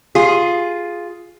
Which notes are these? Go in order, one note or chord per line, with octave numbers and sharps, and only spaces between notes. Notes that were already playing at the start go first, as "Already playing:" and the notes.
F4 G#4